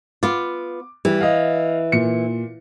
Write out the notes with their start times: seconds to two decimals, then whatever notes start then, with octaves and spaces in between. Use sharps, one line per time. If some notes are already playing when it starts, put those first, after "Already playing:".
0.23 B3 F4 D6
1.05 E3 G3
1.21 D#5 F5
1.92 A#2 C#7